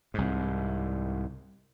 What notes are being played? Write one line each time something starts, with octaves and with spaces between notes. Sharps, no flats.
C2 G#2